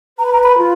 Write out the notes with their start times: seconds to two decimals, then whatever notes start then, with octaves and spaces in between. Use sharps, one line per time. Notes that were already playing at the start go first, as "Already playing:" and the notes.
0.18 B4 A#5
0.25 B5
0.33 A#5
0.44 B5
0.57 F4